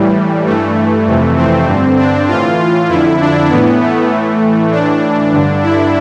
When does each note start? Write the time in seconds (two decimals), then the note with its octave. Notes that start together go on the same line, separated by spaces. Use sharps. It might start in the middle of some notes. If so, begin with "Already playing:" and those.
Already playing: A2 E3 G3
0.46 G2 E3 A3
1.06 F2 C3 E3
1.36 C4
1.67 G2 D3
1.98 D4
2.28 A2 E3 F4
2.89 F2 D3 E4
3.20 D4
3.49 A2 E3 B3
3.80 A3
4.11 A2 E3
4.70 A2 E3 D4
5.32 G2 D3
5.63 E4